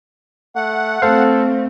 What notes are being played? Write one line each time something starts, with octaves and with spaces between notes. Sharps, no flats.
A3 F#5
A3 C4 A4 C5 F5